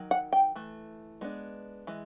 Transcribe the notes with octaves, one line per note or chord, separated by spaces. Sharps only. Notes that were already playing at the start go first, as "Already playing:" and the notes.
Already playing: D#3 F#3
F#5
G5
E3 A3
G#3 B3 D4
E3 G#3